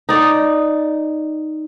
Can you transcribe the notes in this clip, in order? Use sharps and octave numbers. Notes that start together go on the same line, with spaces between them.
D#4 D5